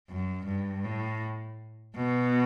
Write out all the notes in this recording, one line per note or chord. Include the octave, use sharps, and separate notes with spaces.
F#2
G2
A2
B2